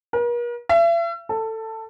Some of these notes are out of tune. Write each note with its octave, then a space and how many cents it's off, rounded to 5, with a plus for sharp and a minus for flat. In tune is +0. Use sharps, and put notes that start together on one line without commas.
A#4 +45
E5 +40
A4 +15